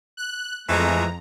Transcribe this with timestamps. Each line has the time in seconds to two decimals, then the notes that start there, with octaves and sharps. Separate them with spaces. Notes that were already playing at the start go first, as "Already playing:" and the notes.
0.17 F#6
0.68 F2 E3 G#3 A3 A#5